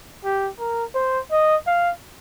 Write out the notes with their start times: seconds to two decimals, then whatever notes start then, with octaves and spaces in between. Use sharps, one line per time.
0.24 G4
0.59 A#4
0.95 C5
1.31 D#5
1.66 F5